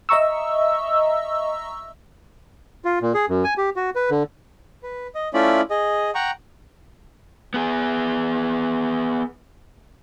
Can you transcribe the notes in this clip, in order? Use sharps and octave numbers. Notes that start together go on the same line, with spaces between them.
D#5 E5 A#5 C#6 E6
F4
A#2
G#4
F#2
G#5
G4
F#4
B4
D3
B4
D#5
A3 C#4 E4 F4 D5 B5
G#4 D#5
F#5 G5 A#5 C#6
B3 G#4